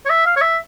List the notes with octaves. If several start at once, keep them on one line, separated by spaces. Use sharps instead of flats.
C#5
E5
F5
C#5
E5